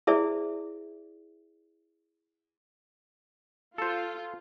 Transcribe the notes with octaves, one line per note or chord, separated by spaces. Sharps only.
E4 G#4 C5 D5 E5
F4 A4 C5